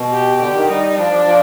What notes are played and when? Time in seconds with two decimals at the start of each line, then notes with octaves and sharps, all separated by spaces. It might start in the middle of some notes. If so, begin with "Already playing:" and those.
Already playing: B2
0.12 G4
0.40 D3 G4
0.55 D#3
0.69 G3 D#4
0.98 F3 D4
1.13 F3
1.26 F3